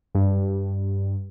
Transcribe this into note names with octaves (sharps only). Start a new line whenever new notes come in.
G2